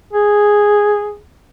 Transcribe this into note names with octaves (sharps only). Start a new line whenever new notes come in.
G#4